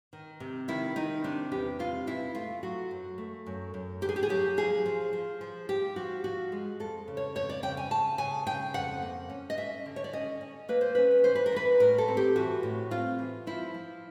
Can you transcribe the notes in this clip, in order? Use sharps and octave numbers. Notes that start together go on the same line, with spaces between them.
D#3
C3
D#3 E4
D#3 D#4
C3 D4
E2 G4
C3 F4
E2 E4
A3 F4
F#3 F#4
F#2
A3
F#2
F#2
D3 G4
G#4
G4
G#4
F#3 G4
F3 G#4
F3
F3
F3
F3 G4
F3 F#4
F3 F#4
G#3
F2 A4
C#3
C#5
F2 C#5
D5
C#3 G5
G#5
C#3 A5
C#3 G#5
C#3 G5
F2 F#5
A#3
C#4
D#5
C#4 E5
D3
C#5
D5
C#4 D#5
C#4
A#3 B4
C5
C#4 B4
E3 C5
B4
A#4
E3 B4
A2 A#4
A4
C4
G4
E3 F#4
A2
C4 F4
E3
F3 E4
F3